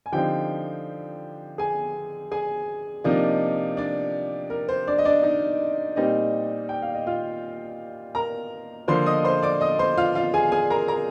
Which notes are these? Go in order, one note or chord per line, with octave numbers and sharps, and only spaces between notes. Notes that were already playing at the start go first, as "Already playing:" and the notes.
G#5
D3 F3 C4 D#4 G4 G5
G#4 G#5
G#4 G#5
C3 F3 A#3 D4 D#4 D#5
D4 D5
A#4
C5
D4 D5
D#5
D4 D5
D#4 D#5
A#2 G3 C4 D#4 D#5
G5
F5
D#5
F4 F5
A#4 A#5
D3 F3 A#3 C5 C6
D#5 D#6
C5 C6
D5 D6
D#5 D#6
C5 C6
F4 F5
F4 F5
G#4 G#5
G#4 G#5
A#4 A#5
A#4 A#5